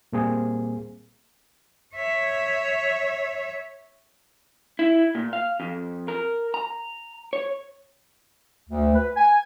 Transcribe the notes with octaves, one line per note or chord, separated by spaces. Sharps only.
A#2 G3 A#3 C4 G#4
C#5 E5
E4
A#2
F5
F2
A#4
A#5
C#5
D2
B4
G#5